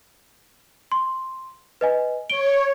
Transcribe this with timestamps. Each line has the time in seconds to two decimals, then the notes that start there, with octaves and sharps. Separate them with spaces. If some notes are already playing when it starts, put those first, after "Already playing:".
0.92 C6
1.81 B4 D#5 G#5
2.30 C#5 D7 G7